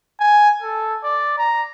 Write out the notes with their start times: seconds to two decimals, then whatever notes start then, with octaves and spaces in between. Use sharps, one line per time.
0.20 G#5
0.62 A4
1.03 D5
1.38 A#5